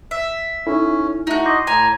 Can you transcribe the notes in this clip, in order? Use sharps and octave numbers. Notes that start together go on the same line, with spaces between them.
E5
C#4 D#4 E4 A4
A3 D#4 E4 F#4 E5
D#5 C6 D6 G6 A#6
A2 G#5 A#5